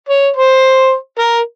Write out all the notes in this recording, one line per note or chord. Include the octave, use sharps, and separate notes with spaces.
C#5
C5
A#4